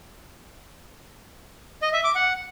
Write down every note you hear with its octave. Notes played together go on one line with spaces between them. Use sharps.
D#5
E5
D6
F#5